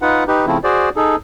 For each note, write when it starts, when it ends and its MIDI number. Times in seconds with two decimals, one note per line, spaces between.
0.02 0.24 63
0.02 0.24 65
0.02 0.24 71
0.02 0.24 78
0.28 0.46 63
0.28 0.46 67
0.28 0.46 71
0.46 0.58 49
0.46 0.58 53
0.46 0.58 57
0.46 0.58 60
0.46 0.58 64
0.64 0.89 66
0.64 0.89 68
0.64 0.89 72
0.64 0.89 74
0.96 1.16 63
0.96 1.16 68
0.96 1.16 69